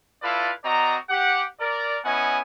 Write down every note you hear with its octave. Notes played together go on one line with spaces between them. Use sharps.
E4 F4 A4 B4 D5 F5
C4 F#4 D5 D#5 A#5
G4 F#5
A#4 D5
B3 C#4 E4 D#5 F#5 G#5